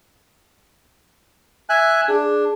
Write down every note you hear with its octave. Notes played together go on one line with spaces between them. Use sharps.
E5 G#5 F#6
D4 G#4